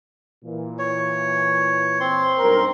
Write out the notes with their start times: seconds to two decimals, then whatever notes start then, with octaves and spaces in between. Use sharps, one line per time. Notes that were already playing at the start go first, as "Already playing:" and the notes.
0.44 A#2 E3
0.79 C#5
2.00 C4 C6
2.39 B1 G2 A#4